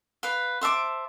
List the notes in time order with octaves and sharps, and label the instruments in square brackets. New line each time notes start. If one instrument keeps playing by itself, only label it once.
[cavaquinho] B4 F5
C5 E5 A5 D6